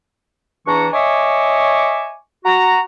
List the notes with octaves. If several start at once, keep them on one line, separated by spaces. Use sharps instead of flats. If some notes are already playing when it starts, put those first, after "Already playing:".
E2 E3 D4 A#5 C#6
C#5 D#5 E5 G#5 C#6 D6
F#4 A#5